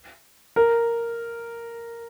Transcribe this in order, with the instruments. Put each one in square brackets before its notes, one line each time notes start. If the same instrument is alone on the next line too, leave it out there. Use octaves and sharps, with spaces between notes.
[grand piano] A#4